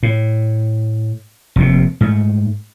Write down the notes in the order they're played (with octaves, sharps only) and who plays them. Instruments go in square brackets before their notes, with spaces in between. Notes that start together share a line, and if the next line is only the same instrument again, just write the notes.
[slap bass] A2
F1 D#2 C3
G#2 A3